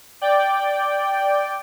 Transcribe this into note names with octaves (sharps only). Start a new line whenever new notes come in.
D5 G5